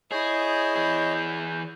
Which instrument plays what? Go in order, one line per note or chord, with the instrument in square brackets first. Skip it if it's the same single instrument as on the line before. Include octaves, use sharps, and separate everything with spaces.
[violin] E4 [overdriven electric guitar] G#4 [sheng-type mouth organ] C#5 D#5 [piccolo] G6
[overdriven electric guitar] E3 G#4